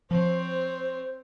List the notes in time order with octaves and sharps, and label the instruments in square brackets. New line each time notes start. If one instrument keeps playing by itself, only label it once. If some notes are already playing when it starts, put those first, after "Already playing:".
[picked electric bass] F3 [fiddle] C4 C#5 [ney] C5